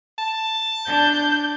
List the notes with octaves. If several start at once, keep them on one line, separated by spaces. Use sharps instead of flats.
A5
D4 G6